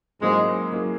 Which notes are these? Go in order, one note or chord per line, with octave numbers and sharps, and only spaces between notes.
G#2 F#3 G#3 A#3 C#4 E4 G#4
F#3 A#3 C#4 E4 G#4